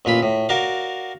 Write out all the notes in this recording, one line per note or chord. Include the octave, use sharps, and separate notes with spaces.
A1 A#2 F4 B5
A2
F#4 A#4 D5 F5